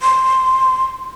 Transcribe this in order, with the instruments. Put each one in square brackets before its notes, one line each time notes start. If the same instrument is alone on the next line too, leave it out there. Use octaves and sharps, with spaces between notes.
[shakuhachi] C6